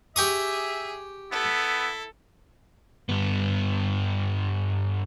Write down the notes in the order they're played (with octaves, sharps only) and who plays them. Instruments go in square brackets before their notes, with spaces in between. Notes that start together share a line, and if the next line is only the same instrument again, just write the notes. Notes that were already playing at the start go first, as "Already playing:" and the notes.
[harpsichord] G4 C#6 D#6 [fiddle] G#4 [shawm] E5
[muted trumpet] B3 [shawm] E4 [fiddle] A4
[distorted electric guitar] G2 B3